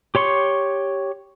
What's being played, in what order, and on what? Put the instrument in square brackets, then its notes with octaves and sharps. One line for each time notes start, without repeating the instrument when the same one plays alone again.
[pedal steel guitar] G4 C#5 C6 C#6